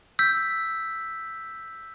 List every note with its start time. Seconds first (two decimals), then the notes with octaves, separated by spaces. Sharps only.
0.19 E6 G6 B6